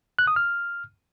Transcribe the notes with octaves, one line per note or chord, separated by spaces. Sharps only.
F#6
D#6
F6